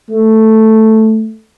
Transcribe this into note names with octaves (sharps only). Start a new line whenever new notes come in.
A3